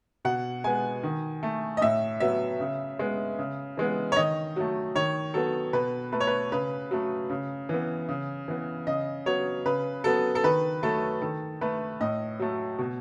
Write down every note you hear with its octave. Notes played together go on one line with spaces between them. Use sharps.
B2 F#5
G#3 B3 G#5
D#3
A3
D#5
A2 E5
F#3 B3 E5
C#3
G#3 B3
C#3
E3 G#3 B3
C#5
D#3 D#5
F#3 A3
D#3 C#5
F#3 B3 A4
B2 B4
A3 B4
C#5
B4
C#3 B4
F#3 A3
C#3
E3
B3
C#3
E3 B3
C#3 D#5
F#3 B3 C#5
C#3 B4
F#3 B3 A4
A4
D#3 B4
F#3 A3 A4
D#3 A4
A3 B4
A2 D#5
F#3 A3
B2